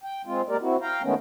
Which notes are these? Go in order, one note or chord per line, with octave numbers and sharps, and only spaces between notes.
G5
G#3 C4 F4
G#3 A#3 G4 A#4 D5
C4 E4 F#4
F5 G5 A#5
D#3 G#3 A3 B3 C#4